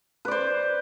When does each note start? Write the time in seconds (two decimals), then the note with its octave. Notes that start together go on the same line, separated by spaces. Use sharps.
0.25 B4
0.28 D5
0.31 C5